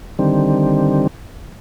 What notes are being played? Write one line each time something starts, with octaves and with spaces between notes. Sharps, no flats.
D3 D#3 G3 C4